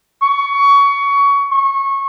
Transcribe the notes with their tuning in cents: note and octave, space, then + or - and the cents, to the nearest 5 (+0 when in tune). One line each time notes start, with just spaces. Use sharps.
C#6 +20
C#6 -20